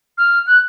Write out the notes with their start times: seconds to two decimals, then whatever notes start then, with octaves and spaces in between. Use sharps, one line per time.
0.18 F6
0.47 F#6